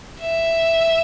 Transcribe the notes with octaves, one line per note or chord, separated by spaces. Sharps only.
E5